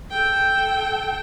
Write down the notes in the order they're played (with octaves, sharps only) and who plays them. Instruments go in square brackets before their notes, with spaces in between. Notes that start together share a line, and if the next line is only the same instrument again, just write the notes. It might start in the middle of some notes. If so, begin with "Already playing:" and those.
[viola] A4 G5